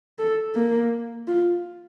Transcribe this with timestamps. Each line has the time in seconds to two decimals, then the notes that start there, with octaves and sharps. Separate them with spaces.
0.19 A4
0.55 A#3
1.28 F4